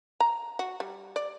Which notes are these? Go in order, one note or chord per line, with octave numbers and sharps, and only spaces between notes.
A#5
F#4
G3
D5